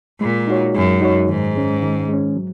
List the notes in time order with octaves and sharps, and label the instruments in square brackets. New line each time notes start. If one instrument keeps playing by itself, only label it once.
[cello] A#2 [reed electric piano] G#3
[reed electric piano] D#4 F#4 C#5
[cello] F#2 [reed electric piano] G#3
[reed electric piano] D#4 F#4 C#5
[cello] G#2 [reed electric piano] D#3
[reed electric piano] G#3 C#4
D#3
G#3 C#4
F#3